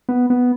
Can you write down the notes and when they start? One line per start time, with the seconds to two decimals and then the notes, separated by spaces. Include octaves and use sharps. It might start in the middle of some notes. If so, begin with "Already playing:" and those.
0.09 B3
0.30 B3